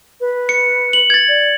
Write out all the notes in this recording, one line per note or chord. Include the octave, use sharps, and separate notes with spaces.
B4
C#7
F#7
G#6 A6
D5